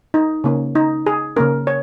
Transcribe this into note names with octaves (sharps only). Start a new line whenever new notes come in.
D#4
C#3 A#3 C#4
D#4
G#4
C#3 A#3 C#4 A#4
C#5